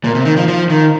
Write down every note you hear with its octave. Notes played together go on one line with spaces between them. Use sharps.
A#2
C3
D#3
F3
F3
D#3